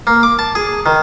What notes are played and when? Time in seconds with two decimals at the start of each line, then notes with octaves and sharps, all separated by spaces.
0.07 A#3
0.23 D6
0.39 A5
0.55 G#4
0.86 D#3